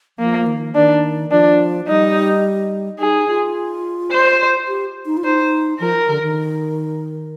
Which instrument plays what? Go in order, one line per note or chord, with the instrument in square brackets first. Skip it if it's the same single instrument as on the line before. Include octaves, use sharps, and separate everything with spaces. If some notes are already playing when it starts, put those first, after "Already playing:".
[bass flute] F3 [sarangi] A#3
[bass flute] D#3
[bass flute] D#3 [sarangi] D4
[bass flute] F3 [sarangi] D4
[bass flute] G3 [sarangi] D#4
[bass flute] D#4 [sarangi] G#4
[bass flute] F4
[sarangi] C5
[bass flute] G4
D#4
F4
[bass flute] D#4 [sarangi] C5
[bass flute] F3 [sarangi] A#4
[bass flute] D3
D#3